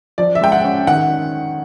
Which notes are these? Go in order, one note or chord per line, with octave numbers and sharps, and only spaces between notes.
F3 D5
E5
G#3 G5
F#5
C#4
D#3 F#5